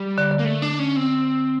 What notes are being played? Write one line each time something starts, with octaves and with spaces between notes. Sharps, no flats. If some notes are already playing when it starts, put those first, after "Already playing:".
Already playing: G3
D3
D3
A#3
A3
D4
C#4
C4